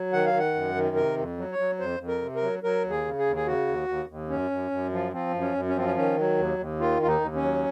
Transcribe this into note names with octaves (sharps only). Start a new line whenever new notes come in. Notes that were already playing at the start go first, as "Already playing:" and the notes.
Already playing: F#3
D#3 F#5
F5
D#3 F#5
F#2
D#3
C3 A#4
F2
F#3
C#5
F#3
F2 C5
F2
A#4
C3
A#4
F#3
F#3 A#4
D#2
G#4
C#3
G#4
D#2
G#4
C#3 F#4
D#2
D#2
D#2
F#2 C#4
F#2
F#2
F3
F3 C4
F#2
C#4
F#2
C#4
F3 C4
C#4
D#3 C#4
F#3
D#2
D#2
D#3 F4
D#2 F4
D#4
D#2
C#4
F#3